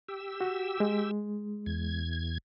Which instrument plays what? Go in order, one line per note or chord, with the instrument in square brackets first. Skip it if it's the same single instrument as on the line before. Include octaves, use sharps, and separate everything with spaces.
[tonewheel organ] G4 E6
[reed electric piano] F#4
G#3
[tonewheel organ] E2 G#6